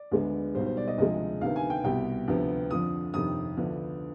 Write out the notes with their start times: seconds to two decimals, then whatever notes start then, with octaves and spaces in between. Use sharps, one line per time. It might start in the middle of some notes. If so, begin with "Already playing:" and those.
Already playing: D5
0.12 D2 D3 G#3 B3
0.55 B1 B2 G3 C5
0.66 C5
0.77 D5
0.88 D#5
0.98 D2 C3 F3 G#3 D#5
1.41 D2 C3 D#3 B3 F5
1.56 G#5
1.70 G5
1.84 C2 B2 G3 G5
2.28 D2 C3 F3 B3
2.71 F2 D3 F3 D#6
3.14 G1 F2 C3 D#3 D#6
3.57 D2 D3 F3 B3